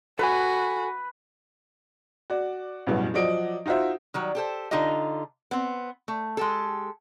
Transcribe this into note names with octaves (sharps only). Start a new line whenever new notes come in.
F#4 A4 B4 G#5
F#4 D5
A1 E2 G2 B2 F#3
F3 F#3 D5 D#5 D7
D#4 F4 F#4 C5 E5
D#3 F#3 G3
G4 A4 C5
D3 D#4 F4 G4 D#5
B3 C4
A3
G#3 G4 A4